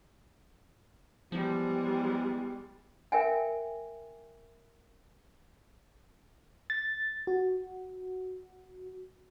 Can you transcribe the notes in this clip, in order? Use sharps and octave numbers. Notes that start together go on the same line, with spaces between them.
E2 F3 G3 G#3
A#4 E5 G5 G#5
A6
F#4